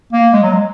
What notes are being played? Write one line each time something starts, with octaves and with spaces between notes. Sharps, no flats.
A#3
G#3
F#3
G#3